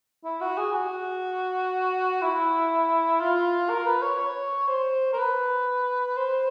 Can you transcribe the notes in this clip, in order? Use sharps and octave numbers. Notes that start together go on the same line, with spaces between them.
E4
F#4
G#4
F#4
E4
F4
A#4
B4
C#5
C#5
C5
A#4
B4
C5